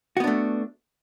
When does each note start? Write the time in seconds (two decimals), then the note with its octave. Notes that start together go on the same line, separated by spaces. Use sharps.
0.17 F#4
0.20 B3
0.24 D4
0.27 A3